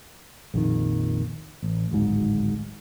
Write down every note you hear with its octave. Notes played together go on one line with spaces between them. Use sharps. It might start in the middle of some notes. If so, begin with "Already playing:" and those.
A#1 F2 D#3
A1
D1 G#1 G#2